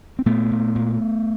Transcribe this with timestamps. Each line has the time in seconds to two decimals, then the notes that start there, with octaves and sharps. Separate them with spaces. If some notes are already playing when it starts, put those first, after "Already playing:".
0.19 C4
0.26 A#2 A3 B3
0.51 A#2
0.75 A#2